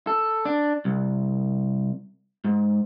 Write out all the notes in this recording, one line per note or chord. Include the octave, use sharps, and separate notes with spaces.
A4
D4
C2
G#2